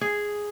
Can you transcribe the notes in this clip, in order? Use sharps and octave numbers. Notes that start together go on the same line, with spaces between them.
G#4